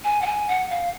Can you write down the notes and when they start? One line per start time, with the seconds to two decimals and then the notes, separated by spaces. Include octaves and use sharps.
0.04 G#5
0.22 F#5
0.26 G#5
0.48 F#5
0.70 F5